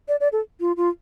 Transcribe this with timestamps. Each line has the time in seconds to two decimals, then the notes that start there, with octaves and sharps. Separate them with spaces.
0.08 D5
0.20 D5
0.32 A4
0.60 F4
0.77 F4